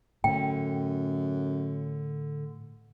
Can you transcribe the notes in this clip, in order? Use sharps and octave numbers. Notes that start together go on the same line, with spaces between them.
F#2 A2 D3 G5